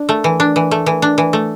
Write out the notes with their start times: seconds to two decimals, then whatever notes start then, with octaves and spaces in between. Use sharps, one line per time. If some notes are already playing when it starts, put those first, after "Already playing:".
Already playing: D4
0.09 A3
0.24 E3
0.40 D4
0.56 E3
0.71 A3
0.86 E3
1.02 D4
1.18 E3
1.33 A3